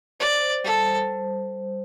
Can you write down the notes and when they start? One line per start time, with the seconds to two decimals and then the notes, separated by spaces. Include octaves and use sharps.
0.20 C5 D5
0.42 C5
0.64 G3 A4
0.87 C5
1.09 G3